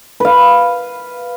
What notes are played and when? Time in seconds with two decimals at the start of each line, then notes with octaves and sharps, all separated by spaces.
0.20 B4 F5